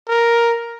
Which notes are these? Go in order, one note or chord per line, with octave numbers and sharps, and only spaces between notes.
A#4